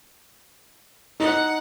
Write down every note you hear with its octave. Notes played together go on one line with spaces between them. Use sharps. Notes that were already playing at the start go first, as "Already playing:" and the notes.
D#4 F#5